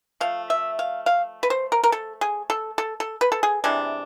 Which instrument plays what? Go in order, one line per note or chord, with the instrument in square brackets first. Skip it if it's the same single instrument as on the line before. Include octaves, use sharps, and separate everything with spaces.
[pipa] F3 A3 F5
E5
F5
F5
B4
C5
A#4
A#4
A4
G#4
A4
A4
A4
B4
A4
G#4
C3 E3 G#3 B3 D4